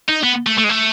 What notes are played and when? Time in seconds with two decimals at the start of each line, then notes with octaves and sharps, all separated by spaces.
0.09 D#4
0.23 B3
0.46 A3
0.58 A3
0.64 G#3
0.69 A3